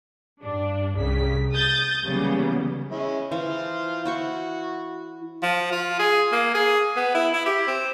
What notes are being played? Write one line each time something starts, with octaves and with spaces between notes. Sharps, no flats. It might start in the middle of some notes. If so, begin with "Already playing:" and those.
G2 D4
C2 C#3 B6
D#6 G6 A6
C#3 E3 F#3 G3 A#3 B3
G#3 C#4 E4
E3 F4 C5 F5
E4 F#4 C5 C#6
F3
F4
G#4
A#3
G#4
B3
E4
E4
G4
C4